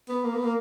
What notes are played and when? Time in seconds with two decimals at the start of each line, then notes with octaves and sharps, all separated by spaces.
0.09 B3
0.24 A#3
0.34 B3
0.44 A#3